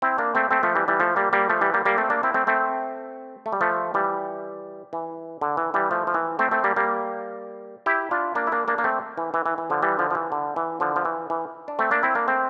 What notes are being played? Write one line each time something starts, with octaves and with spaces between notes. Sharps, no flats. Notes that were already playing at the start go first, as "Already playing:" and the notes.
C4 E4
A#3 D4
A3 C4
A3 C4
F3 A3
E3 G3
E3 G3
F3 A3
G3 A#3
G3 A#3
F3 A3
E3 G3
G3 A#3
G3 A#3
A3 C4
A#3 D4
C4 E4
A3 C4
A3 C4
A3
G3
F3 A3
E3 G3
E3
D3
E3
E3 G3
F3 A3
F3
E3
A3 C4
A3 C4
G3 A#3
G3 A#3
E4 G4
D4 F4
A#3 D4
E4
A#3 D4
A#3 D4
A#3
A3 C4
E3
E3
E3
E3
D3 F3
E3 G3
D3 F3
F3
E3
D3
E3
D3 F3
F3
E3
E3
D4
A3 C4
A#3 D4
C4 E4
A#3 D4
A3 C4